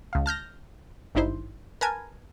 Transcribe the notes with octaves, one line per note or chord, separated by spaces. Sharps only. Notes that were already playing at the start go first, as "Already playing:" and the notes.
C#2 F5
A5 F6 G6 A#6
G#1 G2 D#4 E4 C5
A#4 B4 G#5 A5